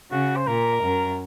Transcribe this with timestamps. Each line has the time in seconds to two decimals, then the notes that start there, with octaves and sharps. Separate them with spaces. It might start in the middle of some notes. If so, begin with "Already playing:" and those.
0.11 C#3 F#4
0.36 C5
0.47 A#2 A#4
0.83 F#2